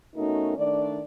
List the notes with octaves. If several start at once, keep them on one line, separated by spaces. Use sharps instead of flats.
B2 A3 C#4 D#4 F#4 A#4
D#3 A3 D4 D5